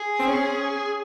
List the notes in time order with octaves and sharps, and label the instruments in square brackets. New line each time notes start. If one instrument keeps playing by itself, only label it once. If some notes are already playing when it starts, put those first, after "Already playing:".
Already playing: [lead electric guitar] G#4
[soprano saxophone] C4
C#4